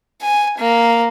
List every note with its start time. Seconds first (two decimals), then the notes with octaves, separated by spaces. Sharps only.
0.22 G#5
0.58 A#3